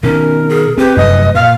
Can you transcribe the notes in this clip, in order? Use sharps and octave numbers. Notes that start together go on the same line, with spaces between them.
B2 D#3 C#4 A#4
G#4
C4 G4 B4
F1 F#2 A3 D#5
A#2 F5